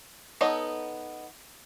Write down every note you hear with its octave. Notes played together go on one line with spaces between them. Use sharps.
B3 D#4 A4 C#5 D#5